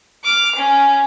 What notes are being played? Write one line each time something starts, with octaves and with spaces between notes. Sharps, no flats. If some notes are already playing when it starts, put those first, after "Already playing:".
D6 F6
C#4